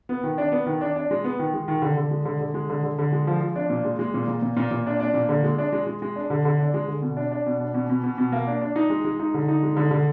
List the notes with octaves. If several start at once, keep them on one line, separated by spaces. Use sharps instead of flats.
B3
D#3
D4
B3
D#3
D4
D4
G#3
B3
D#3
G#3
D#3
D3
D3
G#3
D3
D3
G#3
D3
D3
D3
G#3
F3
F3
D4
A#2
G#3
G#3
A#2
A#2
A#2
A#2
A#2
D4
D4
A#2
D3
G#3
D4
G#3
G#3
G#3
D4
D3
D3
D4
G#3
D3
B2
D4
D4
B2
D4
B2
B2
B2
B2
A#3
D4
D4
D#4
G#3
G#3
D#4
D3
D#4
G#3
D3
D3